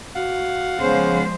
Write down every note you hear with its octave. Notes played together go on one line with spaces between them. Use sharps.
F#4 F5 F#5
C#3 F3 G#3 B3 C5